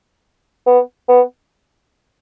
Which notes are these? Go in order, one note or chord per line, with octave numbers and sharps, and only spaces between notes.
B3
B3